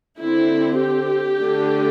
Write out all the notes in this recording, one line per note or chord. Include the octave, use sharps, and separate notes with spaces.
D3 C4 E4
G4
D3 A3 D4